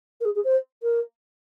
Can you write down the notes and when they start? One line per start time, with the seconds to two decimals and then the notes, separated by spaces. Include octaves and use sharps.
0.20 A#4
0.25 G#4
0.35 G#4
0.44 C5
0.82 A#4